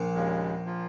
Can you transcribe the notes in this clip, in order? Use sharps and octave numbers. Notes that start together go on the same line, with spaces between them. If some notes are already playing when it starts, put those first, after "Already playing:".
Already playing: A#1 A#2
D#2 C#3 F3 G#3
F3 A#3 F4